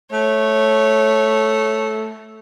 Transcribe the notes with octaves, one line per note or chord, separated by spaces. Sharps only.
A3 C#5